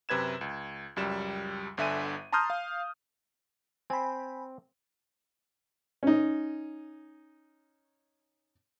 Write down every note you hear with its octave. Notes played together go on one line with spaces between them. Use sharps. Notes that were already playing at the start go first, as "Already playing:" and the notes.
F#2 C3 B4 G#6 E7
C#2
C#2 F#2 G3 E7
G1 D3 E5 G#5 D#7
A5 A#5 C6 D#6 F6 G6
F5
C4 C5 G#5 B5
C#4 D#4